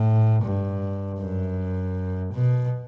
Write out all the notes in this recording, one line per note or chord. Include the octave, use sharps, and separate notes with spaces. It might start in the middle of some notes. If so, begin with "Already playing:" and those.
Already playing: A2
G2
F#2
B2